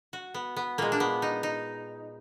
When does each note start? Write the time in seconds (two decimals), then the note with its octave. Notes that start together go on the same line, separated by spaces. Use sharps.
0.13 F#4
0.34 B3
0.56 B3
0.78 A#2 G#3 A#3
0.92 D4
1.00 B3
1.22 D#4
1.43 D#4